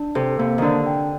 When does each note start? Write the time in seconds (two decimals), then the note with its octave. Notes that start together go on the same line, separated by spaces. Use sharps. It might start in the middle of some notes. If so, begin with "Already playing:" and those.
Already playing: D4
0.15 C3 A4
0.39 C3 A#3
0.58 D3 D#3 D4
0.86 G5